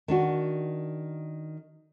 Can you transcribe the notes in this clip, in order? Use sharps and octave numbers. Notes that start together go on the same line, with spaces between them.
D#3 D4 F#4